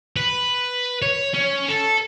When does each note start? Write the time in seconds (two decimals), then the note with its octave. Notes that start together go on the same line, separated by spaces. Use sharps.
0.16 B4
1.02 C#5
1.34 C#4
1.69 A4